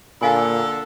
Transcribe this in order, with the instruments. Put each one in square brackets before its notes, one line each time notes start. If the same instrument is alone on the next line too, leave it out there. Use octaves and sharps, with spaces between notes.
[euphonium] A#2 [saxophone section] D3 A4 [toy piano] F5 G#5 B5